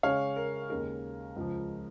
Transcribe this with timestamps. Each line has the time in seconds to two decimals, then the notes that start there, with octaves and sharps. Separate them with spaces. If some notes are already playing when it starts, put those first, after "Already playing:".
0.03 C#3 G#3 C#4 C#5 F5
0.36 A#4
0.70 D#2 C#3 G#3 A#4
1.36 C#2 C#3 F3